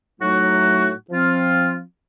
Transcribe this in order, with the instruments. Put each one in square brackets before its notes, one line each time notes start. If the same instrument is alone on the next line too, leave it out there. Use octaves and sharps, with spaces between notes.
[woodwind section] A2 F#3 A3 D#4 F#4
F3 C4 F4